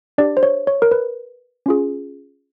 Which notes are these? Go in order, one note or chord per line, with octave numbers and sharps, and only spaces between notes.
D4 G4 D5
C5
C#5
C#5
A#4
B4
C#4 F4 G#4